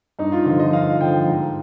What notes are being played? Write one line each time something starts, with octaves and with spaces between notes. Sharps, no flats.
G2 D#4
F4
D3 F3 F4
D#5
G2 F5
D3 F3 G5
G#2